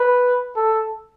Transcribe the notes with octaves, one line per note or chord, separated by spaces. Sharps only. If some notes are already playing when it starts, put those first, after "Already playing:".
Already playing: B4
A4